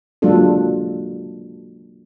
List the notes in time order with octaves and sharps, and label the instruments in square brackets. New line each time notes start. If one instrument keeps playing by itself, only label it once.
[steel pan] F#3 G#3 A#3 D4 F4 A4